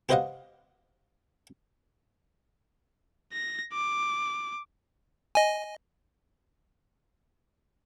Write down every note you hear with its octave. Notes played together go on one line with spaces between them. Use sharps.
G4 B4 C5 D#5 F5 F#5
A#6
D6
D#5 G#5